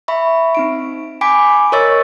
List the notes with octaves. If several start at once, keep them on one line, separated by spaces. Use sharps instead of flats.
E5 B5 C#6
C4 D#4 D7
G5 G#5 B5 D6 B6 D7
A#4 C#5 D#5 C#6 E6 A6